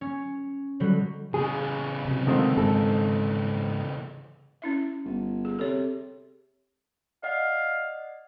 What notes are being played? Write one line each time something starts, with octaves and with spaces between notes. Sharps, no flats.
C#4
B2 D3 F#3 G3
C#3 E3 G#4
C3 F#3
D3 D#3 G#3 A3 C4 F4
G#2 G#3 D#4 A4
C#4 E4 E5
G1
G#4
C3 A4 C#5
D5 D#5 F5 F#5